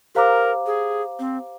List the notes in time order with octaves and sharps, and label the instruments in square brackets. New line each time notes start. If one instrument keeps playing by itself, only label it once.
[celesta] G4 C5 F5 A#5 D6 [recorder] A#4
[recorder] G#4
C4